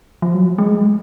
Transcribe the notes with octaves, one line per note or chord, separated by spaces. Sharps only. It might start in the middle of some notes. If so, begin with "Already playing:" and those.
F3
F#3
G#3